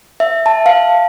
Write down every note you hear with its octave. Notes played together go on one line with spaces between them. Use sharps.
E5
A5
F5